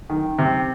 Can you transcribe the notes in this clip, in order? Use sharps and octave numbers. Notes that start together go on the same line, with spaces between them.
D#3
C3